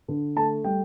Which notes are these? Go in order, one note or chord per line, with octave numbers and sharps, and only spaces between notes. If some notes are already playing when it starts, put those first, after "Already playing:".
D3
A3 A5
G3 G5